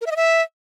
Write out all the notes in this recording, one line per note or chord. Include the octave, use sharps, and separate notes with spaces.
A#4
E5
D#5
E5